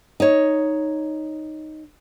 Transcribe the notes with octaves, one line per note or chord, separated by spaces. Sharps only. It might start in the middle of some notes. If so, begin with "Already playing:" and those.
D#4 C#5